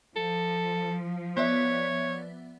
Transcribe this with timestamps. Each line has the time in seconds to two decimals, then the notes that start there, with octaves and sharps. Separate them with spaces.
0.16 F3 A4
1.37 B3 C#5 D5 E5